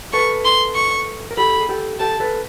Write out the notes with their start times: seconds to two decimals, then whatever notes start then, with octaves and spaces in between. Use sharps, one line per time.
0.13 A4 B4 C#6
0.45 C6
0.75 C#6
1.31 A#4
1.37 G4 A4 B5
1.61 G#4
1.69 G4 A4
1.99 G4 A4 A5
2.20 A4 B4